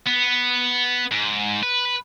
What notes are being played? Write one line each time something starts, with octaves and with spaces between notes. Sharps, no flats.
B3
G#2
B4